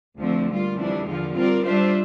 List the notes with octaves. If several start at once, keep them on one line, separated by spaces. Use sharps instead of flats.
D2 D3 F3 A3 C4
G3 A#3 F4
F2 E3 G3 A#3 D4
E2 D3 F3 A#3 F4
G3 C4 F4 A#4 D5
G3 D4 F4 C5 E5